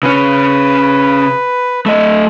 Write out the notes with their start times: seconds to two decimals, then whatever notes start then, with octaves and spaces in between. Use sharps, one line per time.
0.03 C#3 C#4 B4
1.86 A3 D#5